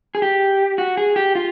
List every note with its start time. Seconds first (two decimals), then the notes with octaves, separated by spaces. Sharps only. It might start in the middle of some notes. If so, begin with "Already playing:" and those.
0.15 G#4
0.22 G4
0.78 F#4
0.97 G#4
1.16 G4
1.35 F4